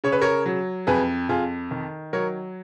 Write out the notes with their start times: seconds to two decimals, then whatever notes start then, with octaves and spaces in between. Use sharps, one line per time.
0.04 C#3 C#5
0.12 B4
0.21 A#4 C#5
0.46 F#3
0.87 F2 G#4 B4
1.29 F2 F4 G#4
1.71 D#3
2.13 F#3 A#4 C#5